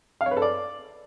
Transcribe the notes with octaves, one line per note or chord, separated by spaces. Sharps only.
F5
C#5
B4
A4
D5